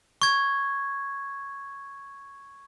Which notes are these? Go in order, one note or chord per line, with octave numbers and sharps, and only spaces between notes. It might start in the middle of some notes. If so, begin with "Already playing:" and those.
C#6 G#6